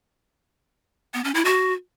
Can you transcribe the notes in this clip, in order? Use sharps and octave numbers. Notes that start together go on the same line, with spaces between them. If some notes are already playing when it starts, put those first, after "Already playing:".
B3
C#4
E4
F#4